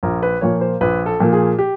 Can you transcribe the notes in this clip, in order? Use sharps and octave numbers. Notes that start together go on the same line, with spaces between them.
A#1 A#4
B4
A#2 F3 A#3 C#5
C5
A#1 B4
A4
A#2 F3 A#3
G#4
G4